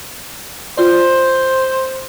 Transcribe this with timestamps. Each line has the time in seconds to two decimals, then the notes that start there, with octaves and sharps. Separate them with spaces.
0.77 F4 C5 D5